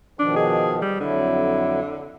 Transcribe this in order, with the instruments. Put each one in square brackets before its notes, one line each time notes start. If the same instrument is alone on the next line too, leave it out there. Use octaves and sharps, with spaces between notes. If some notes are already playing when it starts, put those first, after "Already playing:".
[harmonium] B2 D#3 F3 [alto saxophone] D4
[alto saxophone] G#4
G3
[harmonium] F2 F#3 E4 [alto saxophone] D3